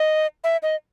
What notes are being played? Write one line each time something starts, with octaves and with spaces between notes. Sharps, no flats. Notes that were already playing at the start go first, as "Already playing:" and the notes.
Already playing: D#5
E5
D#5